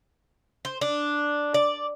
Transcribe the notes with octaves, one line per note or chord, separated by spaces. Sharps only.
C5
D4
D5